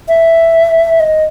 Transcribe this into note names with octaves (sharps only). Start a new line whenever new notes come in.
E5
D#5